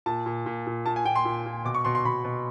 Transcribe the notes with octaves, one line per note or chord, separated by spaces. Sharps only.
A#2 A5
A#2
A#2
A#2
A#2 A5
G#5
A#2 G5
C6
A#2
A#2
B2 D6
C#6
B2 C6
C6
B2 B5
B2